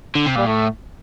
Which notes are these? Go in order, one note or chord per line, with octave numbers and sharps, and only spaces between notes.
D3
C3
A#2 G3
A2 A3